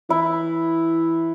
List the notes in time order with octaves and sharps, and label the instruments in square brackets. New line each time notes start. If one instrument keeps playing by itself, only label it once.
[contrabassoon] E3 [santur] E4